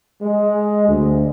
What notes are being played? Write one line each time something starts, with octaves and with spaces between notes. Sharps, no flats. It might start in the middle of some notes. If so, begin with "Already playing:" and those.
G#3
D2